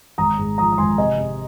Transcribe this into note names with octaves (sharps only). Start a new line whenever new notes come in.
G#1 A#5 D#6
G#2
F3 A#5 D#6
D#6
G#1 G#5 C6
C3 D#5 G#5
C3